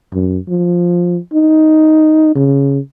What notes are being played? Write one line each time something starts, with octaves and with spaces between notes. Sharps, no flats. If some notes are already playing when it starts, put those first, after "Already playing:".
F#2
F3
D#4
C#3